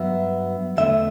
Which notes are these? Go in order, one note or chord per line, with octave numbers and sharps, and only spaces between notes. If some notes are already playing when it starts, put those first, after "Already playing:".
Already playing: G2 F#3 B3 E5
E2 D3 A3 E5